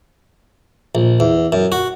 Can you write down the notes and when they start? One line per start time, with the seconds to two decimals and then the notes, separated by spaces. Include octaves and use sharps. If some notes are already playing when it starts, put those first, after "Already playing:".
0.95 A#1
1.20 E2
1.52 F#2
1.72 F#4